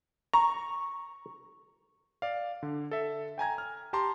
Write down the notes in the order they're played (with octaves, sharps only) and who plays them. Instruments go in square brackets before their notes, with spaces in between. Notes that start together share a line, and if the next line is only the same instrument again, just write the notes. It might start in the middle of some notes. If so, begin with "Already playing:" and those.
[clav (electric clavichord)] A#5 [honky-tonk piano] C#6
[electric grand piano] D5 F5
D3
A4 E5
G5 G#5 A#5 G#6
F6
G4 A5 A#5 C6